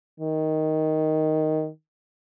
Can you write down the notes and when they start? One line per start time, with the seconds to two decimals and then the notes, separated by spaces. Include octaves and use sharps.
0.20 D#3